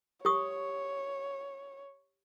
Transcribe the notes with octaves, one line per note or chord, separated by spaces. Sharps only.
G4 C#5 C#6 D#6